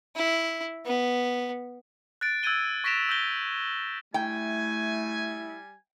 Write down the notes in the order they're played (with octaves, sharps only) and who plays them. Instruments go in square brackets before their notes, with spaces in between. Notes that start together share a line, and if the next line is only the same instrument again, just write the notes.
[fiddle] E4
B3
[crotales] F#6 A6 D7
E6 F#6 G#6 A6 D#7 G7
C#6 A#6 B6 D7 E7 F7
E6 G6 A#6 G7
[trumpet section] G3 G#5 [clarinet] A3 [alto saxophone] E4 [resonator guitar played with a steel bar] G5